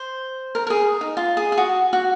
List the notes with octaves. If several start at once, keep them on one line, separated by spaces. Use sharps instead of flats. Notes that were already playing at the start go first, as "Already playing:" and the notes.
Already playing: C5
A#4
A#4
G#4
D#4
F4
G#4
G#4
F#4
F#4